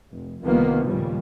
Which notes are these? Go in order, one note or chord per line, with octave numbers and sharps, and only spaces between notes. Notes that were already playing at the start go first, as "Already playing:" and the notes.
F1
C2 C3 D#3 F3 A#3 B3
D#2 A#2 C#3 F3 G3